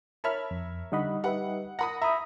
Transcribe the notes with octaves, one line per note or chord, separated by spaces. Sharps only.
A#4 C#5 E5 A5 B5 F6
F2
D3 G3 D#4 D#5 F#5 B5
G4 B4 E5 F#5
A#4 F#5 B5 D#6 A#6
E5 A#5 B5 D#6